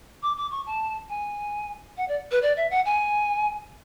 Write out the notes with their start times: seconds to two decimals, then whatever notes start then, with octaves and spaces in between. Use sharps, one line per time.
0.23 D6
0.37 D6
0.51 C#6
0.66 A5
1.09 G#5
1.97 F#5
2.08 D5
2.31 B4
2.42 D5
2.57 E5
2.71 F#5
2.85 G#5